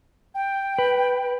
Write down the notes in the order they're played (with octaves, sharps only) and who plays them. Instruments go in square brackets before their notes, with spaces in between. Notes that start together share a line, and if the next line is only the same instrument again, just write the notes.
[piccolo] G5
[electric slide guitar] B4